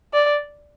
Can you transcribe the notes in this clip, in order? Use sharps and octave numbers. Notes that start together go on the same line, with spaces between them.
D5